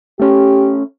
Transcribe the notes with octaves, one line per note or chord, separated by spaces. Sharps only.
A3 C#4 G4